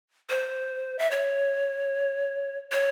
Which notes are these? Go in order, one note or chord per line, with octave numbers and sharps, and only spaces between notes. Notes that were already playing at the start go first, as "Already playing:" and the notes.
C5
E5
C#5
C#5